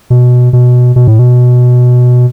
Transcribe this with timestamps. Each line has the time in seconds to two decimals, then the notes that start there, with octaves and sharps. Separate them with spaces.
0.10 B2
0.53 B2
0.96 B2
1.07 A2
1.19 B2